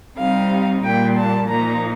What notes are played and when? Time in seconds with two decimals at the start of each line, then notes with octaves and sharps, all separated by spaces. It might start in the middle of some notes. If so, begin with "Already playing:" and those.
0.17 C3 G3 C4 D#4 F5
0.83 A#2 G3 A#3 G5
1.15 A5
1.48 A#2 F3 A#3 D#4 A#5